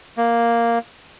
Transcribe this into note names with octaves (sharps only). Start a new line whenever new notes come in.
A#3